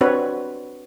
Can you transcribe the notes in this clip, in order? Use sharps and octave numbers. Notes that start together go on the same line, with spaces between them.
C4 D4 F#4 B4 C#5